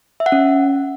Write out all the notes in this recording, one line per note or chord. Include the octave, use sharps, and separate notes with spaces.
E5
F#5
C#4